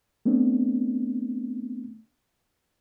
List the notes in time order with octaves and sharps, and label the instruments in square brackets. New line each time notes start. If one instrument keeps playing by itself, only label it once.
[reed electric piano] A3 B3 C4 D4